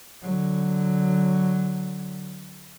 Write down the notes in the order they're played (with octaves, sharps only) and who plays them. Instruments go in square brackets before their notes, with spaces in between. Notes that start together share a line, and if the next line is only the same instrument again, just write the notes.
[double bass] D3 F#3